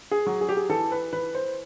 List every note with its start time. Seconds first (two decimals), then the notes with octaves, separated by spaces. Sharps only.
0.11 G#4
0.26 F#3
0.41 G#4
0.49 G4
0.57 G#4
0.69 E3 A4
0.92 B4
1.13 E3 B4
1.35 C5